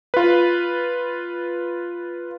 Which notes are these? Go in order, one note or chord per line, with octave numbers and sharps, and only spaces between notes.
F4 B4